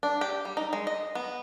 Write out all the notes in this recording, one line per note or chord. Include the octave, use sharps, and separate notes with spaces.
D4
G4
G3
D#4
G#3
D#5
B3